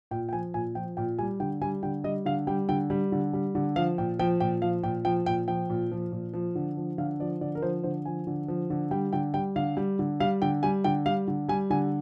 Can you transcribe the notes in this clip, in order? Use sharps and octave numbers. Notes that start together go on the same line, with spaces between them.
A#2 G5
G5
F3 G#5
A#2 G#5
F3 G5
A#2 G5
G3 G#5
D3 G5
G3 G#5
D3 G5
G3 D#5
D3 F5
G3 G5
D3 G5
G3
D3
G3
D3
F3 F5
A#2 G5
F3 G5
A#2 G5
F3 F5
A#2 G5
F3 G5
A#2 G5
F3 G5
A#2
F3
A#2
F3
D3
F3
D3 F5
F3 D5
D3 D5
A#4
F3 C5
D3 C5
F3 G#5
D3
F3
D3
G3 G5
D3 G5
G3 G5
D3 F5
G3
D3
G3 F5
D3 G5
G3 G#5
D3 G5
G3 F5
D3
G3 G#5
D3 G#5